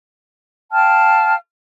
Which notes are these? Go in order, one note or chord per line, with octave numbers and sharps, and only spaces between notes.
F5 G5 A5 F6